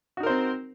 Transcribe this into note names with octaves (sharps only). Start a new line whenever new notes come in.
C4 D#4 F#4 A#4 C5